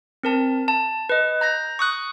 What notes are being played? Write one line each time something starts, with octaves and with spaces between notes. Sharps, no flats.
C4 A#4 A5
A5
B4 D#5
A#5 G6 A#6
C#6 D#6 F#6